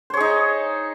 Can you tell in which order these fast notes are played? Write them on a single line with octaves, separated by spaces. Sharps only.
C5 C#5 G#4 D#4